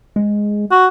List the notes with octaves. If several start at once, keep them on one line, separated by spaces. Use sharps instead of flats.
G#3
F#4